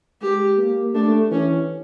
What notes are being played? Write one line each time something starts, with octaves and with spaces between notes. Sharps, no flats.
G#3 G4
A#3
A3 D4
E3 C#4